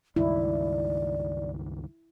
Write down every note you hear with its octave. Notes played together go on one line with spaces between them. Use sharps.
C#2 G2 D#3 E4 D5